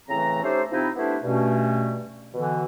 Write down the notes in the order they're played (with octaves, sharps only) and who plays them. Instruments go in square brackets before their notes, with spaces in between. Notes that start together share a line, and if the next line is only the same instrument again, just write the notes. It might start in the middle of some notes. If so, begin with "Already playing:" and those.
[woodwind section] A2 C#3 E3 A3 C4 A#5
A3 C#4 D#4 G4 A4 C5
C3 F3 C4 D#4 E4
A3 B3 D4 E4 G4 C5
G2 B2 A3 C#4
B2 D3 E3